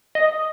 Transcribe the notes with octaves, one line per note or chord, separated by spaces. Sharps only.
D#5